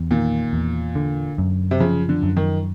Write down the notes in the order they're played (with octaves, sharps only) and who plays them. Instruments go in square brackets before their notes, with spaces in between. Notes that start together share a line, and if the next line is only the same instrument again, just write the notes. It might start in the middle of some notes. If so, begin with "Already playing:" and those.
Already playing: [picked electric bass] E2
[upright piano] A#2 [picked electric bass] D#3
[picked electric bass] E2
D3
F#2
[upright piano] C3
[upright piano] C#3 [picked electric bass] F3
[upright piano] D3
[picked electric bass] F#2
[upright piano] D#3